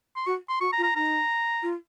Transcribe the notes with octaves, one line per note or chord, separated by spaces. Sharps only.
C6
F#4 C#6
C6
F#4 C#6
A#5
F4
A#5
D#4 A#5
F4